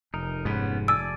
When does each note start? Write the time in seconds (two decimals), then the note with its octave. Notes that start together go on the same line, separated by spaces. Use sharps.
0.14 F1 D#4 A#4
0.45 G#2 B3 C#4 B4
0.88 D5 G#5 A5 E6